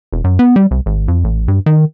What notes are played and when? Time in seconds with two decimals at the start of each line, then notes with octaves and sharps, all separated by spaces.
0.13 E1
0.24 F#2
0.39 B3
0.56 G3
0.71 C2
0.86 G#1
1.08 F2
1.24 A1
1.48 G2
1.66 D#3